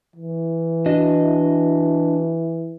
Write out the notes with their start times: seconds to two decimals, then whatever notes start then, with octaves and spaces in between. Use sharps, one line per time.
0.16 E3
0.86 D4 F#4 D#5